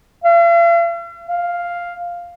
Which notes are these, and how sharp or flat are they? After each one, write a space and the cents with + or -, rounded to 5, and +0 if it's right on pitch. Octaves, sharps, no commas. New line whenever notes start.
F5 -45
F5 +0